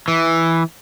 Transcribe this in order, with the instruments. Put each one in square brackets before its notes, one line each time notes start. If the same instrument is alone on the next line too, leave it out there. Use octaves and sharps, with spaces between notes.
[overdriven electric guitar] E3